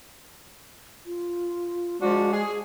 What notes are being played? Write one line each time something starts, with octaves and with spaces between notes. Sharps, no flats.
F4
F3 G#3 D4 F#4
G#4